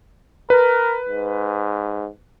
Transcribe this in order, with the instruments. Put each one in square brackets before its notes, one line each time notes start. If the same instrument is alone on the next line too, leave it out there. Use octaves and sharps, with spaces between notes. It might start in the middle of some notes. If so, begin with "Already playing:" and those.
[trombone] A#4 [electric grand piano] B4
[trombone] G#2